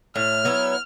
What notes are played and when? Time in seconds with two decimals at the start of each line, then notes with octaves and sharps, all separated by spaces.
0.16 A2 F6
0.45 F#3 B3 E4